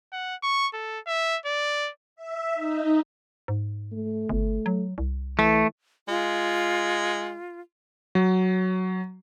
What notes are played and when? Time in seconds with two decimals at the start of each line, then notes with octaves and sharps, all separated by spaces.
0.13 F#5
0.43 C#6
0.74 A4
1.07 E5
1.46 D5
2.16 E5
2.55 D#4
3.48 G#2
3.92 A3
4.29 G1
4.66 F#3
4.98 C2
5.39 E3 A3
6.08 G#3 F4
8.15 F#3